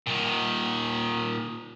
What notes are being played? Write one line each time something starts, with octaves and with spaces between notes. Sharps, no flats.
A#2 D#3